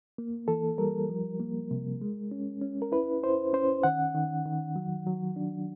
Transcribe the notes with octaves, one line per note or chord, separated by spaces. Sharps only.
A#3
E3 A4
G3 A#4
F3
A#3
C3
G#3
C#4
C#4
A#4
E4 B4
E4 C5
C#4 C5
D#3 F#5
D#3
D#3
F#3
F#3
D4